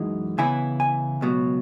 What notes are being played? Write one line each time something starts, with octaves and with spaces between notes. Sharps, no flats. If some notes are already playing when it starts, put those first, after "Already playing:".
Already playing: F#2 E3 G#3 D#4
C#3 E3 B3 E4 G#5
G#5
C#2 B2 F#3